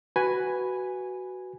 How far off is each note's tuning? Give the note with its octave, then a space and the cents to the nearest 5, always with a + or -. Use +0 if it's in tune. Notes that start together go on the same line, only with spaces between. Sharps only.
F#4 +10 B4 +0 G#5 -5